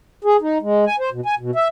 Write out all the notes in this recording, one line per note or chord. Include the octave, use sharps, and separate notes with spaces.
G#4
D#4
G#3
G#5
C5
B2
G#5
B2
E5